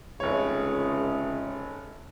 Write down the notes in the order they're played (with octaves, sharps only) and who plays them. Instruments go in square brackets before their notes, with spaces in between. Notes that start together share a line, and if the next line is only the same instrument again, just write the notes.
[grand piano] F1 C#5 [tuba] C#2 [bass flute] G#4